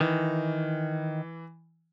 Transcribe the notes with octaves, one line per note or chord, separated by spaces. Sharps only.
D#3 E3